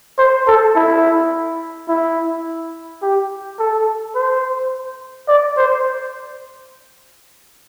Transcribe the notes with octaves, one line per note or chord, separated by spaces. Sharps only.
C5
A4
E4
E4
G4
A4
C5
D5
C5